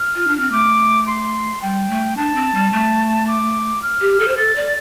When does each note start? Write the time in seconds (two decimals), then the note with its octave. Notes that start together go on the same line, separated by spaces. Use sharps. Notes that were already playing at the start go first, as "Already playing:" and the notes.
Already playing: F6
0.15 F4
0.28 D4
0.40 C4
0.52 A3 D6
1.07 C6
1.62 G3 G5
1.90 A3
2.17 D4 A5
2.36 C4
2.54 G3
2.73 A3
3.27 D6
3.82 F6
4.01 G4
4.20 A4
4.28 C5
4.37 A4 A6
4.56 D5